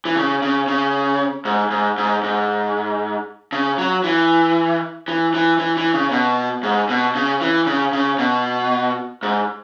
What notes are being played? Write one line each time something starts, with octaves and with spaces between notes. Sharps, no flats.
E3
C#3
C#3
C#3
G#2
G#2
G#2
G#2
C#3
F#3
E3
E3
E3
E3
E3
C#3
B2
G#2
B2
C#3
E3
C#3
C#3
B2
G#2